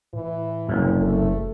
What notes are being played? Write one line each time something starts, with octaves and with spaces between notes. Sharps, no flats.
A2 E3
F#1 C2 F#2
F1 A3